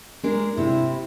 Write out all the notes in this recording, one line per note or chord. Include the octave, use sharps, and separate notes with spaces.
G#3 D4 A#4
C3 E4